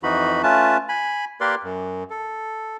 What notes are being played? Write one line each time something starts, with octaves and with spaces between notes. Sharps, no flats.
F2 E3 D#4 F#4 B5
A3 C#4 F4 B4 A5
G#5 B5
A#3 G4 A#4 B4 D5 C6
F#2
A4